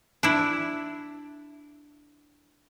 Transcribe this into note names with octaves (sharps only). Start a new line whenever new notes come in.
D4 E4